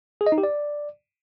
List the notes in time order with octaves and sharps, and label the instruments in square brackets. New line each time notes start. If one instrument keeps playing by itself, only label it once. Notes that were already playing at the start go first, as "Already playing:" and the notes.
[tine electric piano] G#4
D#5
D#4
G4
D5